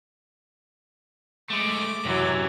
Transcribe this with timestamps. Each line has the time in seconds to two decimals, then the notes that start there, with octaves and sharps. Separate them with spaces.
1.50 G#3 A3 D6
2.05 F#2 C3 E3 F#3